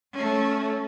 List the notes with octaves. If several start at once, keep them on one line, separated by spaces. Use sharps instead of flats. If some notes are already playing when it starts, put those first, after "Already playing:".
A3 C#4